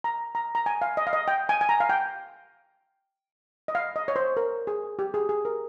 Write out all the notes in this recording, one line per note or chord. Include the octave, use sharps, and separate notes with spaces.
A#5
A#5
A#5
G#5
F5
D#5
F5
D#5
G5
G#5
G#5
A#5
F5
G5
D#5
F5
D#5
C#5
C5
A#4
G#4
G4
G#4
G#4
A#4